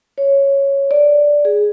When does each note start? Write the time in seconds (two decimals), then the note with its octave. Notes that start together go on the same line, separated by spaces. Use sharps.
0.18 C#5
0.91 D5
1.45 G#4